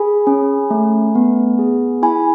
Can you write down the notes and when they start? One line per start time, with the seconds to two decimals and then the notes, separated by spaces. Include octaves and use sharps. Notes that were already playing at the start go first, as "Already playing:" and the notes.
Already playing: G#4 G#5 B5
0.27 C#4
0.70 A3
1.15 B3
1.59 G#4
2.02 E4 G#5 B5